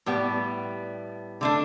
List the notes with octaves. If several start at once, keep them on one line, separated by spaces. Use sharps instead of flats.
A2 G3 B3
D3 A3 D4